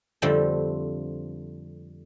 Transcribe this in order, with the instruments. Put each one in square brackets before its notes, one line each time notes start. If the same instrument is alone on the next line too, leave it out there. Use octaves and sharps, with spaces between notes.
[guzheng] F2 D3 F3 G3 A3 C4